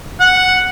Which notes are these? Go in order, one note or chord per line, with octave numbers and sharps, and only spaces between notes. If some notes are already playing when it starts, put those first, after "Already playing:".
F#5